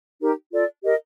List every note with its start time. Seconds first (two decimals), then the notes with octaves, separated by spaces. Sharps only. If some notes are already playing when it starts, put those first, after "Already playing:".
0.20 D#4 G4 A#4
0.51 F4 A4 D5
0.82 G4 A#4 D#5